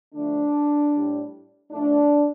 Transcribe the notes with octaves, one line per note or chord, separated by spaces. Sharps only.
D3 F3 A3 D4
A2 G3
A2 F3 A3 D4